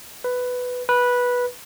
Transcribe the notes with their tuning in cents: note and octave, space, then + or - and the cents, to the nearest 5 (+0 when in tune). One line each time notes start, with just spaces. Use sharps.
B4 +10
B4 -10